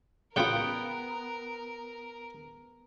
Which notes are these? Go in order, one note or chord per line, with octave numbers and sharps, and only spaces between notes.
C#3 B3 F4 A#4 F#5 G5